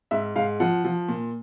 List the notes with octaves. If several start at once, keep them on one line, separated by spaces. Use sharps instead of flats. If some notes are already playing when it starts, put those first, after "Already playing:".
G#2 E5
G#2 F5
F3 F#5
F3
A#2